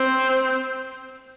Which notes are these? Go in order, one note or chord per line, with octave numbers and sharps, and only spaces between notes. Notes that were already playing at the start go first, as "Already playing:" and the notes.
Already playing: C4